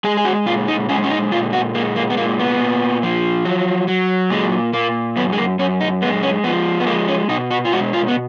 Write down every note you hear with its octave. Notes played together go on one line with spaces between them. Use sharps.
G#3 G#4
G#4
F#4
A#2 F4
D#4
G#3 C#4
C#4
D#4
A#2 F4
F#4
G#3 A#3
A#3
B3
A#2 A#3
B3
A#2
F3
F#3
F#3
A#2 G#3
A#2 A#3
F#2 B3
G#3
A#3
F#2 C#4
D#4
G#3 B3
C#4
F3 B3
B3
G#3 A#3
C#4
B2 D#4
F#4
F4
G#3 F#4
F4
B3